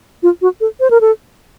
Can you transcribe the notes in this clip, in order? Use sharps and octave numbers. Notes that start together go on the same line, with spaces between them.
F4
F#4
A4
C5
A#4
A4